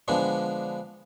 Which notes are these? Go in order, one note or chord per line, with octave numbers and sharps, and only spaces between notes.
D3 F3 G#3 B3 D4